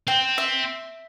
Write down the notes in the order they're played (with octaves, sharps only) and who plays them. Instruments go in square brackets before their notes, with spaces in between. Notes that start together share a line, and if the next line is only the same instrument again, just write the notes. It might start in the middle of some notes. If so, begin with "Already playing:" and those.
[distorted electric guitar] C4 [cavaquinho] G5
[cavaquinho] E5